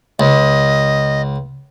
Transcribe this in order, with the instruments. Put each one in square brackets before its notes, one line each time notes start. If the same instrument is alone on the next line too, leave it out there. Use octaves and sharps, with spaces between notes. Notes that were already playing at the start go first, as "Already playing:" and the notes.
[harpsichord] C#2 [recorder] D#5